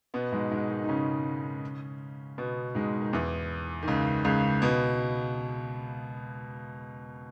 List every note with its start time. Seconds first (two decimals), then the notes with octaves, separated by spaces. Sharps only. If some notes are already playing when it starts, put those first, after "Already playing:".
0.14 B2 B3
0.32 G#2 G#3
0.51 G#2 G#3
0.70 D#3 D#4
0.84 D#4
0.89 C#3 C#4
2.38 B2 B3
2.75 G#2 G#3
3.02 D#3
3.13 E2 E3
3.83 D#3
3.88 C#2 C#3
4.25 C#2 C#3
4.62 B2 B3